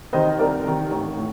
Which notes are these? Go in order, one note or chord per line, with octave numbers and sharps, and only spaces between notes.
C3 D#3 C5 D#5
C2 A#4 D5
C3 D#3
A1
A2